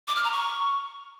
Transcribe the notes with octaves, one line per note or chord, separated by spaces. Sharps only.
D6
F6
A#5
C#6